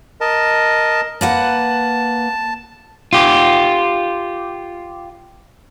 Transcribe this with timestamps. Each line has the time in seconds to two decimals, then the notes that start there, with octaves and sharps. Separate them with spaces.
0.21 A#4 D#5 A5
1.21 A#3 B4 F#5 A5
3.13 F4 G4